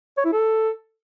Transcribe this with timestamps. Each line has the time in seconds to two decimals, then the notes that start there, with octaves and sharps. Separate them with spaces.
0.17 C#5
0.25 E4
0.33 A4